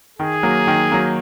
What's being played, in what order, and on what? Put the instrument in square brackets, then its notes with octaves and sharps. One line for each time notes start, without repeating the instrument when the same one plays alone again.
[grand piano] D#3 [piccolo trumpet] G#4
[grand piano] F#3 A#3
D#3
F#3 A#3